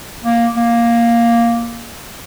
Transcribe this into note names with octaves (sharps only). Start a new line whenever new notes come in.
A#3
A#3